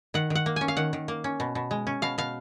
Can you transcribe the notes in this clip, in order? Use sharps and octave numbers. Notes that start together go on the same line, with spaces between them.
D#3 F#5
D#3
F#5
A#3
C#4 G#5
F5
D#3 F#5
D#3
A#3
C#4
B2
B2
G#3
C#4
B2 F5
B2 F5